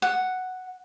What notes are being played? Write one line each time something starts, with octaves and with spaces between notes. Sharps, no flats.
F#5